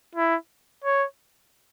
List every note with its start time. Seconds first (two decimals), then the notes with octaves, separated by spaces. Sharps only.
0.15 E4
0.84 C#5